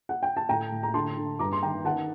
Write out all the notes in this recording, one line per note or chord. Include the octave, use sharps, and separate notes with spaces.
F#5
G5
A5
A2 G5 A#5
A2
A#5
D3 A5 C6
D3
G2 A#5 D6
C6
D#3 G5 A#5
D#3 F#5 A5